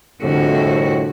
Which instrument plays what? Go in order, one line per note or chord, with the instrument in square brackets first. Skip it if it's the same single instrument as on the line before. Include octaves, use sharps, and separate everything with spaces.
[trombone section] C2 F2 A2 [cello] D3 F#4